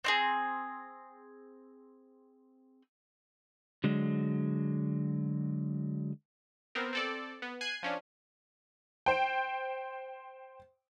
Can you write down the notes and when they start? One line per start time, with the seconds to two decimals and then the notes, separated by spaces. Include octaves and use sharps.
0.04 C4 D#4 G#4
3.84 D3 F#3 G#3
6.75 B3 C4 A#4
6.93 C4 A4 D5
7.42 B3
7.61 G#5 F#6 G#6 C7 D#7
7.83 F3 C#4 D4
9.06 C5 G5